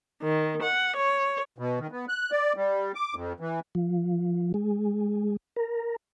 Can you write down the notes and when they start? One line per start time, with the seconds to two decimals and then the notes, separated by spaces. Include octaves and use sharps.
0.23 D#3
0.63 F#5
0.96 C#5
1.58 B2
1.79 D#3
1.92 B3
2.09 F#6
2.31 D5
2.56 G3
2.95 D6
3.15 F2
3.40 E3
3.75 F3
4.54 G#3
5.56 A#4